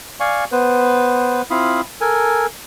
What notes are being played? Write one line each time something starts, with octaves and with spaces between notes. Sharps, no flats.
D5 F5 G#5 C#6
B3 B4 C5
C4 E4 F4 F5 B5 D#6
A4 A#4 G#5